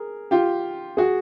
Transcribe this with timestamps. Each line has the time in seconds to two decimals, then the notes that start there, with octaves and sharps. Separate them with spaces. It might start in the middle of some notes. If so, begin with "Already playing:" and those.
Already playing: G#4 A#4
0.31 F4 G4
0.97 F#4 G#4